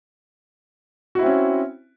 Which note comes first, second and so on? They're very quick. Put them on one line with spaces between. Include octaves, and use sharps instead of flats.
F#4 E4 C4 C#4